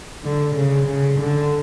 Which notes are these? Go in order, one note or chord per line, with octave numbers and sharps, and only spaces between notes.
D3
C#3
C#3
D3